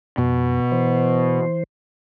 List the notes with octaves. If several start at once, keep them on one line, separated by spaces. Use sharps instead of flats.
F2 B2
E3 C5